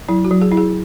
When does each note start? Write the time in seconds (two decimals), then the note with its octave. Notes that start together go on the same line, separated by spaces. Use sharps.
0.09 F#3 E4
0.25 F#4
0.31 F#3
0.41 G#4
0.51 E4
0.57 G#4